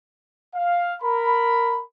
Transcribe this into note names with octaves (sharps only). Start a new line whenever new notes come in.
F5
A#4 B5